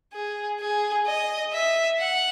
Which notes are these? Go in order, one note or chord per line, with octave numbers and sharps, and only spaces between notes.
G#4
G#4
D#5
E5
F#5